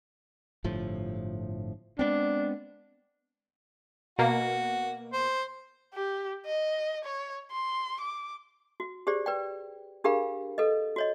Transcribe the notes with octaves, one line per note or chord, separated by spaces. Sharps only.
G1 A2 F3
G#3 B3 C4 D4
B2 A#3 F#4
C5
G4
D#5
C#5
C6
D6
F#4
G4 G#4 C5 D5
B4 D5 G5
D4 G4 G#4 A#4 F5 B5
A4 B4 D#5
F#4 C#5 D#5